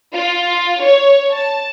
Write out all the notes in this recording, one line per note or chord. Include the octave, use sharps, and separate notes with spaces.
F4
C#5
A5